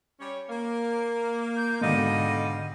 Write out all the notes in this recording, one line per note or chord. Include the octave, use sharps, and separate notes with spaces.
G3 C#4 C#5
A#3
G6
G#2 B2 D3 G3 A4 D#5 F5